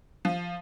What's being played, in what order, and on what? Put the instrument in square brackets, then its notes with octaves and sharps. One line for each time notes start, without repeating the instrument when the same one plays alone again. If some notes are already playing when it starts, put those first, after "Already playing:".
[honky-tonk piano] F3